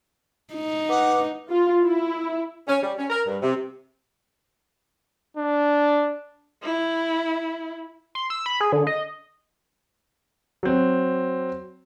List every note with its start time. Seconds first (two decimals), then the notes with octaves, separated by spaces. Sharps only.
0.54 D#4
0.89 B4 F#5 D6
1.50 F4
1.83 E4
2.68 C#4
2.83 G3
2.98 C#4
3.10 A#4
3.27 G2
3.42 C3
5.37 D4
6.63 E4
8.15 C6
8.30 E6
8.46 B5
8.61 G#4
8.72 D3
8.87 D#5
10.63 F#3 C4